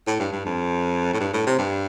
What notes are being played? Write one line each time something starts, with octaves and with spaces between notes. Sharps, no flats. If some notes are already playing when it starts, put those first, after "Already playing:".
A2
G2
G2
F2
A2
G2
A2
C3
G2